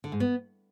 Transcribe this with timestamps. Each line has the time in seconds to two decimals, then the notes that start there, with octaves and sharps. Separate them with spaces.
0.04 D3
0.12 G#2
0.20 B3